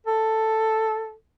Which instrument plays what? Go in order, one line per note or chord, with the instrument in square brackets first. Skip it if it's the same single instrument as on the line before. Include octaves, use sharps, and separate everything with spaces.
[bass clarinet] A4